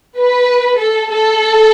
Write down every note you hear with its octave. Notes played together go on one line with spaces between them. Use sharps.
B4
A4
A4